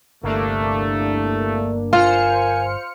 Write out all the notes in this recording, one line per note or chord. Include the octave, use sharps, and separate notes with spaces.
G1 C2 A3 A#3 D4
F4 A#4 C5 F5 G#5 F6 C#7